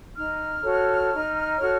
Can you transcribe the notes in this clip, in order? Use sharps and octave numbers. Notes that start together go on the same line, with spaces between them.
D#4 F6
F#4 A4 C#5
D#4
F#4 A4 C#5